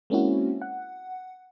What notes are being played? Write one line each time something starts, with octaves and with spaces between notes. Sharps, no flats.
G#3 A#3 C4 C#4 E4 F#4
F#5